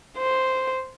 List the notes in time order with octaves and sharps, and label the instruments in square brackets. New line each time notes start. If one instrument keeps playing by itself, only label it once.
[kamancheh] C5